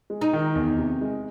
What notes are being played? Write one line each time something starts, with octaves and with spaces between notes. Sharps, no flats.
G#3
D#4
D#3
E2
C3
G#3